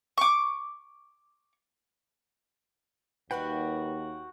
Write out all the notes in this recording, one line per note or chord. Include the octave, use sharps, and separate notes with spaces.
C#6 D6
D#2 G3 D#4 F#4 B4 F#5 G5